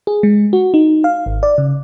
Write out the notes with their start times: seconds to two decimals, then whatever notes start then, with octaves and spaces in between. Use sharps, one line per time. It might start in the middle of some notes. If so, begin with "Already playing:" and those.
0.07 G#4
0.23 G#3
0.53 F#4
0.74 D#4
1.04 F5
1.26 G#1
1.43 D5
1.58 C#3